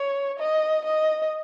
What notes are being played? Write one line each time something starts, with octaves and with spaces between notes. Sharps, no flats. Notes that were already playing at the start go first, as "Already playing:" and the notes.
Already playing: C#5
D#5
D#5